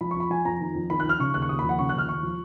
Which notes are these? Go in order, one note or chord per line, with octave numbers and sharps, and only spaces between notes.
F3 B5
C#6
F2 B5
F3 G#5
F2 A#5
D#3
F2
D#3 B5
F#6
F2 F6
C#3 C#6
D#2 F#6
C#6
D#2 D#6
B5
F3
F#5
C#3 C#6
F#6
D#2 F6
D#2 C#6
F3